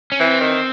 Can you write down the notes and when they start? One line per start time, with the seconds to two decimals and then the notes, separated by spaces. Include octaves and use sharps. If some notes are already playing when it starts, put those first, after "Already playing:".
0.12 C#4
0.20 E3 C4
0.41 D#3